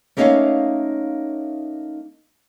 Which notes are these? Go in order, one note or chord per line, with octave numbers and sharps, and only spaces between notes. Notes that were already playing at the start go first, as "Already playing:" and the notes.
A3 A#3 C#4 D#4 C#5 F5